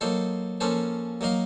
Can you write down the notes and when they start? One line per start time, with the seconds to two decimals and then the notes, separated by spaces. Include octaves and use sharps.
0.01 F#3 A#3 D#4 A4 C5
0.61 F3 A#3 C#4 A4 C5
1.21 F#3 A#3 D#4 A#4 F5